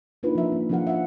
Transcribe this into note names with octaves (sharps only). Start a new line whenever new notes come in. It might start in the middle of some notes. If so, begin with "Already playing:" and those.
A#3 D4 D#4 F4 B4
F3 E5
A#3 C#4
F3 C#4 D4 A4 F5 F#5
E5 F#5